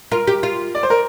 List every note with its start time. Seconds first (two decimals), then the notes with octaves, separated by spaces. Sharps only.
0.12 F4 A#4
0.27 G4
0.43 F4
0.75 D5
0.83 C5
0.90 A#4